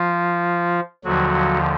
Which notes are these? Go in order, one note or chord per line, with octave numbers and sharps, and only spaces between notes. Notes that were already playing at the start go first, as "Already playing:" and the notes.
Already playing: F3 F4
D#2 D3 F3 F#3 F#4